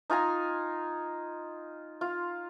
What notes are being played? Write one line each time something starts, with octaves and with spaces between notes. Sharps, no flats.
D#4 F4 G#5 A#5
F4